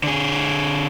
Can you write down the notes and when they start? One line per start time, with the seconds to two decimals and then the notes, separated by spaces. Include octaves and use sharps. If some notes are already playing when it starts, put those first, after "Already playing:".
0.04 D3 G#4